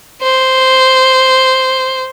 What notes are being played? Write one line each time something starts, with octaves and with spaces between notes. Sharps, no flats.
C5